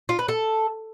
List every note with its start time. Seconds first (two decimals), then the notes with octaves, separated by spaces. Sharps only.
0.09 F4
0.19 B4
0.28 A4